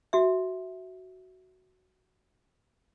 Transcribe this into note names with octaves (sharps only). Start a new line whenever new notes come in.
F#4 E5